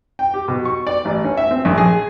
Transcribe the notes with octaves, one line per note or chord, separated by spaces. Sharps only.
G5
G4
B2
C#6
D5
A1
C#4
E5
C4
A#1
G#4